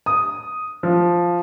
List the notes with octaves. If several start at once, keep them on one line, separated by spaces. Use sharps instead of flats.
D#6
F3